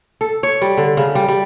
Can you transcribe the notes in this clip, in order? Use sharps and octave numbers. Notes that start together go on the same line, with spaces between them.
A4
C#5
G3
D3
C#3
G3
G3